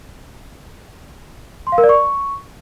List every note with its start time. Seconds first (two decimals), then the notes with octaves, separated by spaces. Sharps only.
1.67 C6
1.72 F5
1.78 A#4
1.84 D5
1.89 C#6